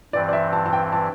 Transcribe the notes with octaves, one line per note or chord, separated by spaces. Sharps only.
G2 E3 C4 D5
D5
E5
A5
A5
G5
A5